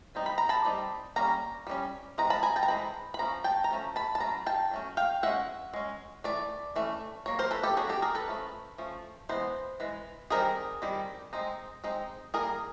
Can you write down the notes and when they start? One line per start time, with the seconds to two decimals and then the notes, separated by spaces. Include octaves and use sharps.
0.15 G3 C4 D#4
0.26 B5
0.38 A#5
0.49 A5 B5
0.65 G3 C4 D#4
1.16 G3 A#3 C#4 A#5
1.67 G3 A#3 C#4
2.18 E3 G#3 C4 A#5
2.30 A5 B5
2.43 G#5 A#5
2.56 G5 A5
2.63 A#5
2.68 E3 G#3 C4 B5
3.14 B5
3.19 F3 A3 C#4 A#5
3.44 G5 A5
3.64 A#5
3.70 F3 A3 C#4
3.96 A5 B5
4.15 A5
4.20 F#3 A3 C#4 A#5
4.46 G5 A5
4.71 F#3 A3 C#4
4.97 F5 G5
5.23 G#3 C#4 E5 F#5
5.74 G#3 C#4
6.24 E3 A3 D5
6.76 E3 A3 C#4
7.26 F#3 A#3 C#5
7.39 A#4 C5
7.51 A4 B4
7.63 G4 A4
7.77 F#3 A#3 C#4 F#4 G#4
7.89 G4 A4
8.02 G#4 A#4
8.15 A4 B4
8.28 F3 A3 C#4
8.78 F3 A3 C#4
9.29 E3 G#3 B3 C5
9.80 E3 G#3
10.30 D#3 G3 C4 G#4 A#4
10.82 D#3 G3 C4
11.33 G#3 C4 D#4
11.84 G#3 C4 D#4
12.34 G3 A#3 D#4 G#4 A#4